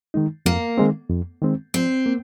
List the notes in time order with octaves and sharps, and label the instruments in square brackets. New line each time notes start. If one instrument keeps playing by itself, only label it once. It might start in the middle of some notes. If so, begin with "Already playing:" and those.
[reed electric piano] D#3 G#3 D#4
[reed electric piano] F2 [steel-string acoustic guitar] A#3
[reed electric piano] D#3 G#3 C4
F2
D#3 G#3 C4
[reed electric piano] F3 [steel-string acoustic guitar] C4
[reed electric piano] A#3